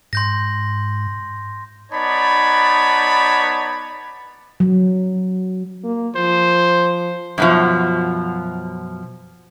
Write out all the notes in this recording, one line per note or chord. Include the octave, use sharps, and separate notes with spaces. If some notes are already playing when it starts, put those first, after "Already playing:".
G#2 C6 G6 A#6
B3 D#4 C#5 D5 A5 B5
F#3
A#3
F3 C5
F#2 B2 F3